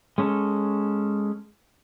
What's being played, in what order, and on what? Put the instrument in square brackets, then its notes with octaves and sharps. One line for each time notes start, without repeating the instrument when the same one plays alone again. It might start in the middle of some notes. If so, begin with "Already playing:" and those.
[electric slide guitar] G#3 C#4 A4